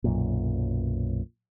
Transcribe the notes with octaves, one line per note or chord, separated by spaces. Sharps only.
B1 F#2 A#2